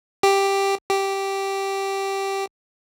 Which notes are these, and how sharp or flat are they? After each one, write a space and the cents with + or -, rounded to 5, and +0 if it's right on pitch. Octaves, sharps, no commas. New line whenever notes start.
G4 +5
G4 -5